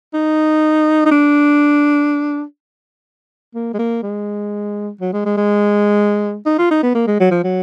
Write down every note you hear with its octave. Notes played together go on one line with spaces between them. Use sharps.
D#4
D#4
D4
A#3
G#3
A#3
G#3
F#3
G#3
G#3
G#3
D#4
F4
D#4
B3
A#3
G#3
F#3
F3
F#3